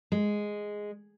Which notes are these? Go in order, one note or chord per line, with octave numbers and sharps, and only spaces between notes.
G#3